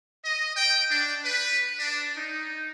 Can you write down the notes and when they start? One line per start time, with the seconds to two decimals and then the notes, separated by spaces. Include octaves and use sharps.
0.23 D#5
0.55 G5
0.89 D4
1.23 B4
1.78 D4
2.15 D#4